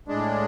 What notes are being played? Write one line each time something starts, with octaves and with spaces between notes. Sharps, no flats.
A2 G#3 D4